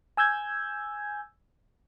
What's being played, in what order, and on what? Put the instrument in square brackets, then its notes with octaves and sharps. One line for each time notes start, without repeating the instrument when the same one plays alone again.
[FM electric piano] G#5 E6 G6 G#6